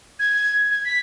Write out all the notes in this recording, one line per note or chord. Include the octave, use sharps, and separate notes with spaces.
G#6
G#6
B6